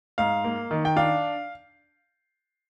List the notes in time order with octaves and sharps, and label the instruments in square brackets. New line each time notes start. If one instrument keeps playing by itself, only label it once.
[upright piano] G#2 F5
A#3
D#3
G5
D4 F5